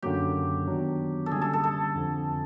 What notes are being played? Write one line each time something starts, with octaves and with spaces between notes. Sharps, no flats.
F#2 D3 F#3 A#3 G4
D#3 F#3 B3 D4
A4
D3 G3 A#3 C#4 G#4
A4
A4
A4
F2 D3 F3